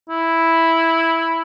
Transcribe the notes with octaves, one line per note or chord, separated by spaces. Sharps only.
E4